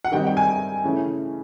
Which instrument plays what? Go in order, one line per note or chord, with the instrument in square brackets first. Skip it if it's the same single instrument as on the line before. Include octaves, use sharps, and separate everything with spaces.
[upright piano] F#5
D#3 G3 C4 D#4 G5
G5
G#5
C#3 E3 A3 C#4